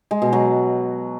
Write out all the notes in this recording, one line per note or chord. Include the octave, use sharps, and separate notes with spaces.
G#3
B2
F#3